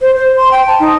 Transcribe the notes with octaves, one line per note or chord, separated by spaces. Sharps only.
C5
C5
C6
G5
A5
D#4